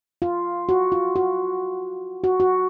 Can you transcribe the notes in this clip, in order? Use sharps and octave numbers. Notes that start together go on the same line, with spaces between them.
F4
F#4
F4
F#4
F#4
F#4